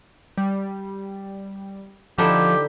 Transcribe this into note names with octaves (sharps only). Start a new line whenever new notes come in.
G3
D3 F3 D#4 E4 G4